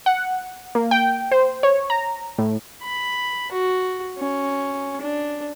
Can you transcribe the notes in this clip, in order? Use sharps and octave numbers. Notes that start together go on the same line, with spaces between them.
F#5
A#3
G5
C5
C#5
A#5
A2
B5
F#4
C#4
D4